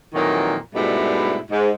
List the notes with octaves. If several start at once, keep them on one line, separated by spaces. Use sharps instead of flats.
F2 A#2 D#3 E3 F#3
G#2 B2 G3 A3 D4 E4
G#2